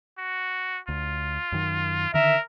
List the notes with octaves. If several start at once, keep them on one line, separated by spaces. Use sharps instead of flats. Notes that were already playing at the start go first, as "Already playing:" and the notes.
F#4
D2 F4
F#2 D#3
D3 D#3 A#4 E5